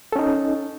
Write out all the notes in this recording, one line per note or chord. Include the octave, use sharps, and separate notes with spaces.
C#4 D#4 A4